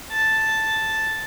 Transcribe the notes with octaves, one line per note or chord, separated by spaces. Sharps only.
A5